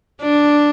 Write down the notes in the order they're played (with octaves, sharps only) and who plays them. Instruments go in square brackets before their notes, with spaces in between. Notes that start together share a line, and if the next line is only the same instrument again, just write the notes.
[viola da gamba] D4